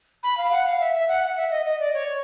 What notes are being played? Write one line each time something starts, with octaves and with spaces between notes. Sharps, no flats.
B5
F5
F#5
F5
E5
E5
F#5
F#5
E5
D#5
D#5
D5
C#5